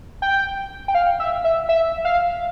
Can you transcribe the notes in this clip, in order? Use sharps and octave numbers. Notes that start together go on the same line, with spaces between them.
G5
G5
F5
E5
E5
E5
F5